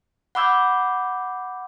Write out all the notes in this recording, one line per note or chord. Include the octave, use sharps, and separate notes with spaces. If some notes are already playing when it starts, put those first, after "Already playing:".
F#5 B5 D6 E6 G6 G#6